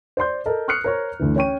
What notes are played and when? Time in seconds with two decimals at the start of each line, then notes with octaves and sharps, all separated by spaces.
0.17 C5 D5 C6 G6
0.46 A4 A#4 D#5
0.68 C#6 D#6 F6 F#6 C7 C#7
0.84 A#4 C5 C#5 A#5 C#6
1.20 D2 D3 E3
1.36 C#4 C#5 G5 C#6 D#7